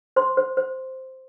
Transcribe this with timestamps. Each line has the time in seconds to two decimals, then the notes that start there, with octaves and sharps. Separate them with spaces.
0.16 C5 C6
0.37 C5
0.57 C5